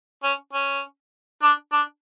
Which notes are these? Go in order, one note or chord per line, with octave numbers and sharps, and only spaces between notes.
C#4
C#4
D4
D4